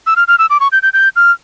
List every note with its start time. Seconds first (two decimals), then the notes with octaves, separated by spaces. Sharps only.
0.07 E6
0.16 F6
0.28 F6
0.39 E6
0.50 D6
0.60 C#6
0.72 G6
0.83 G6
0.93 G6
1.16 F6